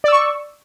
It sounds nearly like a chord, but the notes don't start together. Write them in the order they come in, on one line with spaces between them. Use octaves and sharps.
D5 E6 C#6